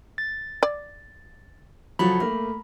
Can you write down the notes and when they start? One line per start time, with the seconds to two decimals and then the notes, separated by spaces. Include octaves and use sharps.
0.18 A6
0.63 D5
1.99 C#3 F3 F#3 A4 B5
2.20 A3 A#3 A#4